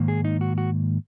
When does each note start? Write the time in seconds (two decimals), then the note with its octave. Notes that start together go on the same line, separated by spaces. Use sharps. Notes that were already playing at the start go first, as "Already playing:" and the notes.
Already playing: G#2 D#3 A#3
0.08 G#4
0.25 D#4
0.41 F#4
0.58 F#4